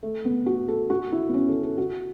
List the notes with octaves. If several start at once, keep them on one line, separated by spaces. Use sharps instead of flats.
A3
B3
F#4
A4
F#4
E4
B3
C#4
A4
A4
F#4